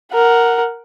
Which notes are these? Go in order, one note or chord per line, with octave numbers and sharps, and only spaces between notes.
A#4 F#5